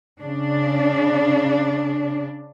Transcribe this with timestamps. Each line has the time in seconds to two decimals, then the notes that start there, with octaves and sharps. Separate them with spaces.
0.23 C#3 D4